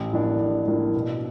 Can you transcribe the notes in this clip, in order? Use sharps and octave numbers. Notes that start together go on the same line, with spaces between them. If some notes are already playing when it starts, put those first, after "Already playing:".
Already playing: A1
A2 F3 A#3 D4
A1
A2 F3 A#3 D4
B2